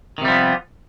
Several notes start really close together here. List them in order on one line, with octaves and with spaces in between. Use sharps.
D#3 C3 G3 F3 B3